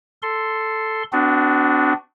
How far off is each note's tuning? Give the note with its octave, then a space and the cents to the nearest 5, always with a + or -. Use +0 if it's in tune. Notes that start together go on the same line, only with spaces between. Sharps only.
A4 +0 C6 +0
B3 +45 D4 -5 F#4 +0